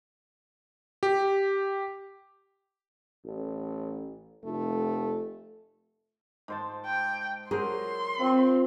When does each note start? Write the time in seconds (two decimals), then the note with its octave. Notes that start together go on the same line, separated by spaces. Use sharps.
1.03 G4
3.25 A1
4.45 F1 A3
6.48 G#2 C5 A5
6.86 G5
7.51 F#3 G#4 A#4 C5 C6
8.20 C4 F4